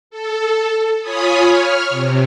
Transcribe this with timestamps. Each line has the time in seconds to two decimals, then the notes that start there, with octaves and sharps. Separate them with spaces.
0.11 A4
1.01 F4 C#5 G#5 B5 D#6
1.46 C#5 F6
1.90 C3